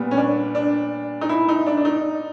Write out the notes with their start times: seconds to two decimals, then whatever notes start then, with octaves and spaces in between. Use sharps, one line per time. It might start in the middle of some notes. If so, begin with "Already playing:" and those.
Already playing: A#2 G3 B3
0.11 C#4
0.17 D4
0.55 D4
1.21 D#4
1.29 E4
1.49 D#4
1.66 D4
1.77 D4
1.85 D#4